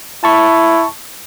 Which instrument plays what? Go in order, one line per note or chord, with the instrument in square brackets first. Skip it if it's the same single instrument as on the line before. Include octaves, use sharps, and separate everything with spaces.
[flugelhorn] E4 [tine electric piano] A5 C#6